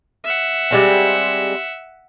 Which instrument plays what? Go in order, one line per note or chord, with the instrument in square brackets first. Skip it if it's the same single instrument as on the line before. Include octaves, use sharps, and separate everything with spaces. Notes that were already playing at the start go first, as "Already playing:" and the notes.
[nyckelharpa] E5 F#5
[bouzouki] G3 G#3 C4